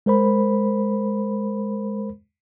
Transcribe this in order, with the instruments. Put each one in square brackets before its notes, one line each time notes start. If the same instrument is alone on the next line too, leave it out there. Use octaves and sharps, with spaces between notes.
[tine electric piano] G#3 A#4 C5 B5